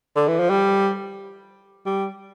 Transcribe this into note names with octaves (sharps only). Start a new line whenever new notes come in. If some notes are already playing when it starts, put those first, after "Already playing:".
D3
E3
F3
G3
G3